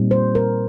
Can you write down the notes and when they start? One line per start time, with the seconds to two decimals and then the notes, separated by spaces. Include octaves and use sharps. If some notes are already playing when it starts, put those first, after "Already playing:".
Already playing: A#2 G3 C4 D#4
0.11 C5
0.35 A#4